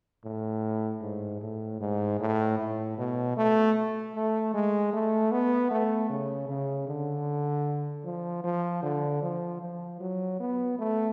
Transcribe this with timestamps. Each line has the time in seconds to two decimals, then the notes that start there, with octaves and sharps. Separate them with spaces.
0.24 A2
1.02 G#2
1.41 A2
1.80 G#2
2.19 A2
2.59 A2
2.98 B2
3.37 A3
4.15 A3
4.54 G#3
4.93 A3
5.31 B3
5.70 A3
6.10 C#3
6.49 C#3
6.88 D3
8.04 F3
8.44 F3
8.83 D3
9.22 F3
9.61 F3
10.00 F#3
10.40 B3
10.79 A3